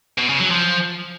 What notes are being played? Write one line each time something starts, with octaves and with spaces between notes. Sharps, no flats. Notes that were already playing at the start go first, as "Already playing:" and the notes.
B2
C#3
F#3
F3